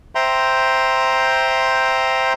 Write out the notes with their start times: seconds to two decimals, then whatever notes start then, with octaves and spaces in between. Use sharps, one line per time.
0.15 C5 E5 G5 A#5 C6